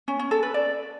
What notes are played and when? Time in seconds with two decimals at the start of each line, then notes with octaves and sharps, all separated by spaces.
0.08 C#4
0.19 C#4
0.31 A4
0.43 B4
0.54 D5